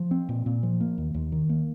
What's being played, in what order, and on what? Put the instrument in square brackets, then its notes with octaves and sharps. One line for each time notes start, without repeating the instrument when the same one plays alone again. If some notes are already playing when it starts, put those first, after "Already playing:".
Already playing: [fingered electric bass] F3
C4
A#2
A#2
F3
A#3
D#2
D#2
D#3
A#3